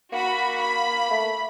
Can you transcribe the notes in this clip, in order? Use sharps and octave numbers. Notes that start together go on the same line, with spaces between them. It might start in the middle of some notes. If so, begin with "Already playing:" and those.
A#3 F#4 B5
B5
A3